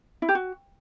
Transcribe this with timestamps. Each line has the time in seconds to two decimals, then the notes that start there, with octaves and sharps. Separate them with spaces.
0.22 E4
0.29 G4
0.35 F#4